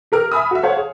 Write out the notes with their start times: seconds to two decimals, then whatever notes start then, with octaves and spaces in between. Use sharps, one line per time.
0.12 G4 A#4 F6
0.32 E5 G#5 B5 D#6
0.51 F#4 E5
0.63 C5 C#5 F5 F#5
0.77 G#4